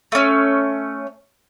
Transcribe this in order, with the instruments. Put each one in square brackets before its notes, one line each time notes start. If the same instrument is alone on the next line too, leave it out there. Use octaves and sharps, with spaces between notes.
[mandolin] A3 C#4